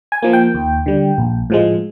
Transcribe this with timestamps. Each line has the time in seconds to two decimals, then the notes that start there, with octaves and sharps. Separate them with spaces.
0.12 G#5
0.22 F3 A#3
0.33 G5
0.55 D#2
0.86 D3 G3
1.18 A#1
1.50 A2 F3 G#3